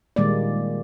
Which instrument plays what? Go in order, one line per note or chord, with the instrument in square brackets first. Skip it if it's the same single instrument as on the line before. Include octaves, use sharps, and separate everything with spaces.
[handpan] A#2 D#3 G3 G#3 A#3 D5